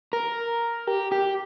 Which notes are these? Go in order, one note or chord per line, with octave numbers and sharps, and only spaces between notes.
A#4
G4
G4